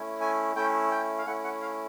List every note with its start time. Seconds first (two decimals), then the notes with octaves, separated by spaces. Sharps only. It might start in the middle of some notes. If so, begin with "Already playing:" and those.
Already playing: A3 C#4 E4
0.21 G#5
0.55 A3 C#4 E4 G5
0.91 G5
1.18 F5
1.27 A3 C#4 E4 F#5
1.44 F#5
1.62 F5